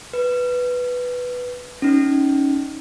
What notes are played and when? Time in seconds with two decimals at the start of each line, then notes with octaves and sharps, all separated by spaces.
0.13 B4
1.82 C#4 D#4